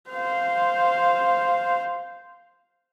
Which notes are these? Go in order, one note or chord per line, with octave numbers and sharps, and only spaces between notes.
C5 F5